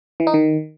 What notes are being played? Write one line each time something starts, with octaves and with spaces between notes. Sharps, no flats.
E3
D#4
D#3